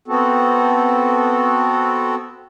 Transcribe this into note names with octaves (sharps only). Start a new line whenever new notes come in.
B3 C4 F#4 A4